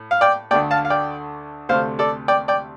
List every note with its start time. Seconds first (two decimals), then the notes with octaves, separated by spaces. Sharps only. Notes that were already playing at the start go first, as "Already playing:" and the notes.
Already playing: A2
0.11 F5
0.21 D5 G5
0.51 D2 D3 A3 D5 G5
0.71 F5 A5
0.85 F5
0.90 D5 G5
1.69 D2 C3 A3 C5 F5
1.99 A4 D5
2.28 D5 G5
2.48 D5 G5